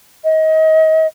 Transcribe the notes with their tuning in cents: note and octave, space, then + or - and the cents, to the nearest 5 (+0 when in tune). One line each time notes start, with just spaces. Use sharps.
D#5 +30